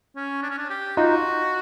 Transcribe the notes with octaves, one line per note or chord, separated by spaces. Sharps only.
C#4
D4
C#4
D4
G4
D#4 F4 F#4